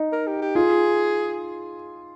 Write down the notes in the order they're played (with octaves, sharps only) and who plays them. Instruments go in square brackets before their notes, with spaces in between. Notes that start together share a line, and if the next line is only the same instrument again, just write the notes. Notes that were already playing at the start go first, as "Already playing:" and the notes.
Already playing: [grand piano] D#4
[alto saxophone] A#4
G4
G4
[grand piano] F4 [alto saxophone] G#4